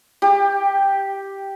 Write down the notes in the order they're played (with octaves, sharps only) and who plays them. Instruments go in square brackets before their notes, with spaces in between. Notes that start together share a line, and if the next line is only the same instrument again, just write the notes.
[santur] G4